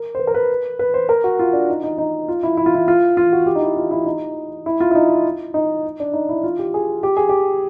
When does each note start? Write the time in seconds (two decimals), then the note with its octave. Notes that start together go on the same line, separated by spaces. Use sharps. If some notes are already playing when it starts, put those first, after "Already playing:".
Already playing: A#4
0.15 C5
0.19 B4
0.27 A#4
0.34 B4
0.79 B4
0.94 C5
1.09 A#4
1.24 F#4
1.39 F4
1.53 D4
1.69 D#4
1.83 D#4
1.98 D#4
2.28 F4
2.43 E4
2.57 E4
2.66 F4
2.75 E4
2.88 F4
3.17 F4
3.32 F#4
3.46 G4
3.55 D#4
3.62 E4
3.76 F4
3.91 E4
4.06 D#4
4.66 E4
4.80 F4
4.91 E4
4.95 D#4
5.54 D#4
6.00 D4
6.13 D#4
6.29 E4
6.44 F4
6.59 G4
6.74 G#4
7.03 G4
7.17 G#4
7.29 G4